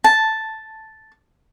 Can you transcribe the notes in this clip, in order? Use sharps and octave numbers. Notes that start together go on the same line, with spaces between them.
A5